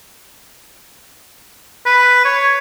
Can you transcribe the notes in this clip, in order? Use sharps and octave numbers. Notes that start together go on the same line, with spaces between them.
B4
C#5